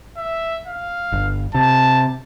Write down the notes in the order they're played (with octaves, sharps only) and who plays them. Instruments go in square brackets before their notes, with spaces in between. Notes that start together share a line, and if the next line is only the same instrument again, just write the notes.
[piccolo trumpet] E5
F5
[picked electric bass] G1
[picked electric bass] C3 [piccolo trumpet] A5